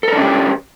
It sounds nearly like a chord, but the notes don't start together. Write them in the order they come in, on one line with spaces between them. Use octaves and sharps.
A4 A#4 D4 C#4 G4